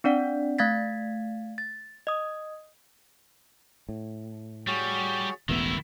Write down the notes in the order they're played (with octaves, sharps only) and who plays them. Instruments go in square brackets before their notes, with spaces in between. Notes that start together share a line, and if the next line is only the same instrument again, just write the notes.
[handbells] C4 D4 D5 F#5
A3 F5 G#6 A6 B6
A6
D#5 D#6
[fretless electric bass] A2
[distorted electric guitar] G3 [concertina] F#4 G#4 C#5
[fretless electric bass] E1 A1 B3 [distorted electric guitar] D#3 E4 [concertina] E5